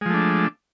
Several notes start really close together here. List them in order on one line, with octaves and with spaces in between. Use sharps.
G#3 F3 A3 D4